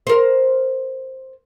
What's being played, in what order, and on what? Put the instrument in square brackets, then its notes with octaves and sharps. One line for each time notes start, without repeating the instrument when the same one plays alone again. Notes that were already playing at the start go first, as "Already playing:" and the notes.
[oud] A#4 C5